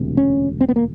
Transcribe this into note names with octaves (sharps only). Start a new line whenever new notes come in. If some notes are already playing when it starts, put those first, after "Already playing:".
Already playing: E1 D2 C3
C#4
C4
B3
A#3